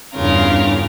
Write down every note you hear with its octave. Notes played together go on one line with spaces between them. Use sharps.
E2 G2 C#3 F4 A#4